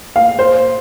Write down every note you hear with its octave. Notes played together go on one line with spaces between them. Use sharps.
F5
C5